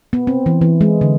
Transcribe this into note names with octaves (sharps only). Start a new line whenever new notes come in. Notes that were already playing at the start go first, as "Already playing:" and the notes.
B3
C4
E3
E3
G#3
D3